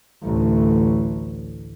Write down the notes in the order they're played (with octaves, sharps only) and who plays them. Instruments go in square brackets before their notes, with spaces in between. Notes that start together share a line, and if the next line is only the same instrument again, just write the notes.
[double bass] A1 D2